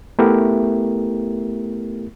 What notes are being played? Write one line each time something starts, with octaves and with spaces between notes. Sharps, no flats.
A3 B3 E4 G4 A#4